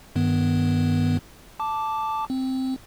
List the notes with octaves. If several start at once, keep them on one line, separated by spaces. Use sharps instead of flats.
G2 D#3 B3
A5 D6
C4